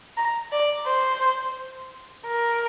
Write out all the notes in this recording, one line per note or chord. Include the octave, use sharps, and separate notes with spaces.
A#5
D5
C5
A#4